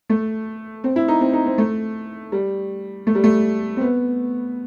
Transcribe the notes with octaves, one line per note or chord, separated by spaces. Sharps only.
A3
C4
E4
D#4
C4
D#4
C4
A3
G3
A3
G3
A3
C4
B3